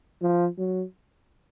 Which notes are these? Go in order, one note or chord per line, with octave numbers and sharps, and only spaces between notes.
F3
F#3